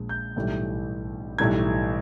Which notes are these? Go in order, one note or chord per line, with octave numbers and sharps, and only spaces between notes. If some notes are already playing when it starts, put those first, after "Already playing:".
Already playing: A#1 A#2 F3 G#3
G6
B1 A2 E3 G3
B1 A2 E3 G3 G#6